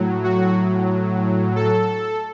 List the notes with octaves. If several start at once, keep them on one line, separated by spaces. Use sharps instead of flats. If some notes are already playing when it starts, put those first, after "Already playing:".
Already playing: A2 F#3
F#4
A4